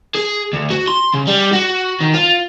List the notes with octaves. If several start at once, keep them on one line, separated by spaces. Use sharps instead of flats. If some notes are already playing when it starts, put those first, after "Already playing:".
G#4
D2
F#4
C6
C#3
G3
F#4
D#3
F4